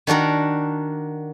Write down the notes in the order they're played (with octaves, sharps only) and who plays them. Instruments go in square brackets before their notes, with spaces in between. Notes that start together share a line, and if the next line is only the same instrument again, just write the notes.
[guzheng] D#3 D4 F#4 A#4